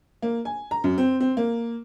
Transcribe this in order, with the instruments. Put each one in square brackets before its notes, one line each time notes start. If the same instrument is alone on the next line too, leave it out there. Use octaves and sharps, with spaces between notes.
[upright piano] A#3
G#5
A#5
F#2
C4
C4
A#3